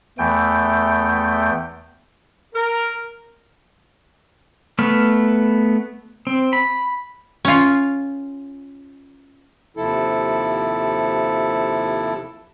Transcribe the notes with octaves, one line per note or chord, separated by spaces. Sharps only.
E2 E3 A3 G5
A#4
A3 B3 B4 F6
C4
B5
C#4 F4
D#2 C3 F3 E4 A4